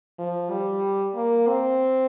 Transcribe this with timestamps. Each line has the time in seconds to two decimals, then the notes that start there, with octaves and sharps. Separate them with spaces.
0.19 F3
0.50 G3
1.15 A#3
1.47 C4